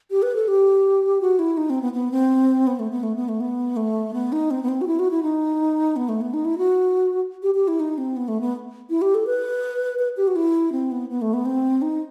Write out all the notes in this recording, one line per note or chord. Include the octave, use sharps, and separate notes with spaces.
G4
B4
A4
G4
F#4
E4
D#4
C4
B3
B3
C4
B3
A3
B3
A3
B3
A3
B3
A3
B3
D#4
C4
B3
C4
F#4
E4
F#4
E4
D#4
B3
A3
B3
D#4
E4
F#4
G4
G4
E4
D#4
C4
B3
A3
B3
E4
G4
A4
B4
B4
G4
F#4
E4
C4
B3
B3
A3
B3
C4
D#4